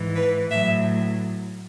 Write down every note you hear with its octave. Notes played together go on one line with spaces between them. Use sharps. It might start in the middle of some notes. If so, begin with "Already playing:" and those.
Already playing: G#2 E3
B4
A2 F#3 E5